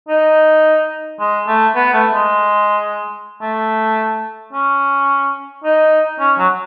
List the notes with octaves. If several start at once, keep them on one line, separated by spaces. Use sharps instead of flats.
D#4
G#3
A3
B3
A3
G#3
A3
C#4
D#4
C#4
F#3